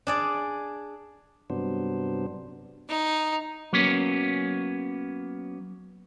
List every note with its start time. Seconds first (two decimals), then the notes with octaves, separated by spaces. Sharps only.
0.07 D4 G#4 D5
1.50 G2 C3 F#3 B3 D4 C5
2.89 D#4
3.73 F#3 A#3 B3 C#4